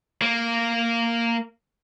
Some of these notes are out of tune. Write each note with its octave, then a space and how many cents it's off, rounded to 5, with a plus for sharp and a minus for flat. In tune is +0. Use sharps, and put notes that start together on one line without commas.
A#3 -10